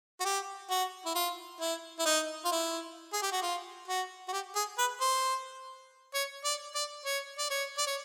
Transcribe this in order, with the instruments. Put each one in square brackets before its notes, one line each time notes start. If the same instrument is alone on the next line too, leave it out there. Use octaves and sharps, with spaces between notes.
[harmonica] F#4
G4
F#4
E4
F4
E4
E4
D#4
F4
E4
G#4
G4
F#4
F4
F#4
F#4
G4
G#4
B4
C5
C#5
D5
D5
C#5
D5
C#5
D5
C#5